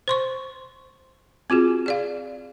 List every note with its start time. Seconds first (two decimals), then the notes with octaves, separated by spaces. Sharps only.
0.08 C5 C6 C#6
1.50 C4 F4 F#4 G#4
1.86 G#4 D5 F5